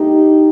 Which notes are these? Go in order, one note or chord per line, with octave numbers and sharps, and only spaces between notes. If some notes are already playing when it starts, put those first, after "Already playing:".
Already playing: G2 A3 D#4 G4